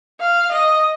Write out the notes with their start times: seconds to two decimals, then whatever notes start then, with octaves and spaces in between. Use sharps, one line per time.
0.21 F5
0.52 D#5